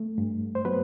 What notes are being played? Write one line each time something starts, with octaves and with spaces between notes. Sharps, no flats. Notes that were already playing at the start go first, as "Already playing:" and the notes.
Already playing: A3
G2
C5
F#3 B3 B4